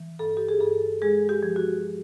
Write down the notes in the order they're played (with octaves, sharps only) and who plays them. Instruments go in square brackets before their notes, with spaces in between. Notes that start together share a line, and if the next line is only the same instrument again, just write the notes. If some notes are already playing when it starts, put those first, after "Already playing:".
Already playing: [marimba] E3
G2 A4
G4
G#4
G2 A4
G#3 G#4
G4
F3
F#4